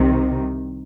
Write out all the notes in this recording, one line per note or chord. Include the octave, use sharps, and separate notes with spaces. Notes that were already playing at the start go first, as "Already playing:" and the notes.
Already playing: C2 C3 D#3